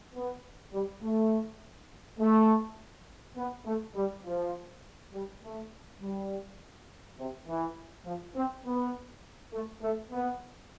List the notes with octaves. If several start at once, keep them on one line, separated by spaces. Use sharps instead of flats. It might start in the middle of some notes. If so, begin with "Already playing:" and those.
B3
G3
A3
A3
B3
A3
G3
F3
G3
A3
G3
C3
E3
F3
C4
B3
A3
A3
B3